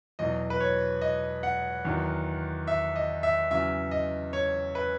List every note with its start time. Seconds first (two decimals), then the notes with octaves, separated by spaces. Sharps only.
0.19 E2 B2 F#3 D#5
0.50 B4
0.60 C#5
1.02 D#5
1.43 F#5
1.85 E2 D#3 F#3
2.67 E5
2.96 D#5
3.23 E5
3.51 E2 C#3 F#3 E5
3.91 D#5
4.33 C#5
4.75 B4